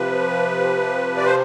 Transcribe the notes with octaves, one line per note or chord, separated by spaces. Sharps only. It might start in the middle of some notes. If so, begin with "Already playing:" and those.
Already playing: C3 F3 B4
D5
C5